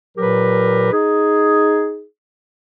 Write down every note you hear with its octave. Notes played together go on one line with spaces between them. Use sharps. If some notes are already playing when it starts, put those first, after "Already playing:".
A#2 F#3 G4 A#4 B4
D#4 G#4